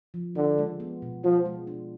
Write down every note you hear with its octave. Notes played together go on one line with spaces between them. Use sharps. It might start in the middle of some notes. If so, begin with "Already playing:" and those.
F3
D3 F4
G#3
B3
B2
F3 F4
G#3
D4